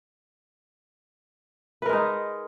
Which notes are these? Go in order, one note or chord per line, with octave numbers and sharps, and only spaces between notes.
G#3 D#4 A#4 B4